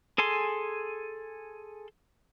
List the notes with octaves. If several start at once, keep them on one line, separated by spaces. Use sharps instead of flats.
G#4 A4 G#5 C6